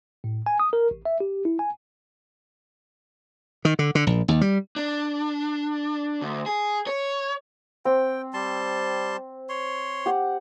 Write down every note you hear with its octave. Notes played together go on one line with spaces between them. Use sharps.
A2
G#5
D#6
A#4
A1
E5
G4
E4
G#5
D#3
D3
D3
A#1
D#2
G3
D4
D2
G#4
C#5
C4 G5
G3 A5 C6
C#5 C6
G4 F#5